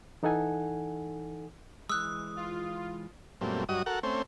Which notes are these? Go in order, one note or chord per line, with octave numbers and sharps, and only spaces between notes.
E3 D#4 A4 F#5 G#5
E3 G#3 D#6 E6 F#6
F4
F#2 A#2 G3 A3 C4
G2 F#3 F#4 D#5 D#6
F#4 A4 A#4 F#5
A3 C4 C#4 C5